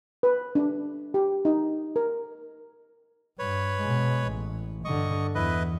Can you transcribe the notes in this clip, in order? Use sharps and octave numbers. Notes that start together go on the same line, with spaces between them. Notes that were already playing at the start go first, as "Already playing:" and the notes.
B4
D4
G4
D#4
A#4
G2 B4 C#5
B2 G#3
A1
G2 D3 D#5 C#6
E2 E4 B4 D#5